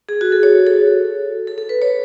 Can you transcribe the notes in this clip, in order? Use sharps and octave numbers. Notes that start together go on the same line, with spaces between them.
G#4
F#4
A4
C#5
A4
A4
A4
B4
C#5